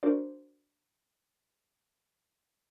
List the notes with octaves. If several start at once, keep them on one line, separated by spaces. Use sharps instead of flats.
D4 F#4 A#4 C5 D5